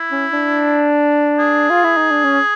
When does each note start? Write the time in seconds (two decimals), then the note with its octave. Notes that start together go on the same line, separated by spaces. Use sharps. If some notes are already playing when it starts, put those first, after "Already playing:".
Already playing: E4
0.12 C#4
0.33 D4
1.39 G#4
1.70 F4
1.84 E4
1.97 D#4
2.11 D4
2.24 C#4